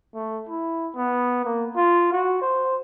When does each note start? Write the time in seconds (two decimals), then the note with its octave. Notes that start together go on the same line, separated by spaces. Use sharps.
0.15 A3
0.49 E4
0.95 B3
1.45 A#3
1.76 F4
2.12 F#4
2.42 C5